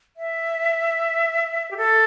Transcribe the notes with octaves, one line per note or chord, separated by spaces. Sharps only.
E5
G4
A4